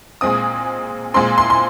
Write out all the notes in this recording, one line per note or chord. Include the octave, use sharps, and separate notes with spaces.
A#2 G#3 C4 D#6
A#2 G#3 C4 C6
C6
C6